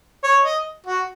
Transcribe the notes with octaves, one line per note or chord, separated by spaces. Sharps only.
C#5
D#5
F#4